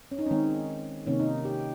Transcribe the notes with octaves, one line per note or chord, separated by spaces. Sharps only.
C#4
D#4
D#3 G#3 C4 C#4
C3 D#3 A#3 C#4
D#4
G4